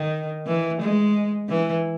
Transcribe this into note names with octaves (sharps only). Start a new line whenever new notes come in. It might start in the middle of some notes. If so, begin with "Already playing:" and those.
Already playing: D#3
E3
G#3
E3